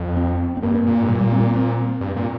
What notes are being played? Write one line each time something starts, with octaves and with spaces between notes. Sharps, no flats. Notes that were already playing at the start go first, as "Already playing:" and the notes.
Already playing: F2
C4
C4
G2 A#3
A#2
G2
A#2 G3
G3
C4
A#3
C4
G2
A#2